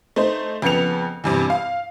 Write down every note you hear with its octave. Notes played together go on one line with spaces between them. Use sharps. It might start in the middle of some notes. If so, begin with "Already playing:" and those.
A3 D#4 C5
F2 C#3 B3 C#7 F7
E2 G2 C3
F5